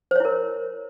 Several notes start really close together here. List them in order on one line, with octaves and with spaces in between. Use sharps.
C5 C#5 E4 A#4